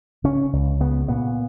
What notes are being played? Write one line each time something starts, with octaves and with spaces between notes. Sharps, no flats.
C#3 C#4
C#2
C#3 B3
A#2 B3